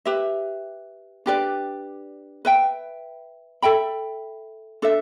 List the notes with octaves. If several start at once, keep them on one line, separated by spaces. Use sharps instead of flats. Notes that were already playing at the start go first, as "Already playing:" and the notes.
G4 B4 E5
D4 G4 B4 D5
B4 E5 G5
A4 E5 G5 B5
D4 A4 E5